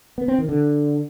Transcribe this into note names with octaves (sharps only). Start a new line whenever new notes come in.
B3
C4
D#3
D3